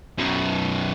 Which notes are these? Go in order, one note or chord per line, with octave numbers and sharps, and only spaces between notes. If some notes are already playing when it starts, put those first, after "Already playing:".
F#2 B2